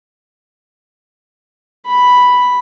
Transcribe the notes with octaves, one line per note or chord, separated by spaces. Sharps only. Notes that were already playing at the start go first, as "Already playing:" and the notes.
B5